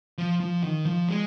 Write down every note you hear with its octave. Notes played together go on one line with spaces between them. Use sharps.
F3
F3
D#3
F3
G#3